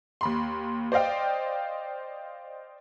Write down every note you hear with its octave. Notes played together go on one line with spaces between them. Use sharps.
D#2 B5 C6
C5 D5 D#5 F5 G5